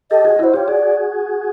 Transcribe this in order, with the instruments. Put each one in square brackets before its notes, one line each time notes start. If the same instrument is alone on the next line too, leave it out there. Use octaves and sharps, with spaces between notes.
[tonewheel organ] G4 A4 [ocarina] D#5
[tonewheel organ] F#4 G#4
[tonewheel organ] E4 F#4 [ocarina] C5
[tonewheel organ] F4 G4 [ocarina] C#5
[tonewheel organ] F#4 G#4 [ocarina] D5